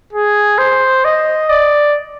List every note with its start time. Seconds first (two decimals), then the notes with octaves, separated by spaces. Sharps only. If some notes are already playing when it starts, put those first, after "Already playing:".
0.13 G#4
0.58 C5
1.04 D#5
1.49 D5